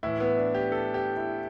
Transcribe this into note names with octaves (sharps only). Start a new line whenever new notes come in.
A2 E3 E4
B3
D4
G4
A4
G4
E4